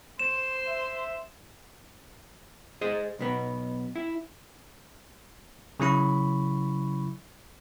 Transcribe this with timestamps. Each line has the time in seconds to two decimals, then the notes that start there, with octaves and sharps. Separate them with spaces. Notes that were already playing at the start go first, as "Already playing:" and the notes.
0.19 C5 E7
0.67 E5
2.81 G#4 C5 D#5
3.19 B1 B2 B3
3.96 E4
5.80 C#3 F#3 E4 B5 C#6